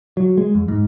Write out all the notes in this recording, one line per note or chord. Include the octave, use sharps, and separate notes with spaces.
F#3
G#3
F2
G#2